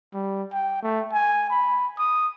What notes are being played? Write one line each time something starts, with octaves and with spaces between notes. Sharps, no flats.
G3
G5
A3
G#5
B5
D#6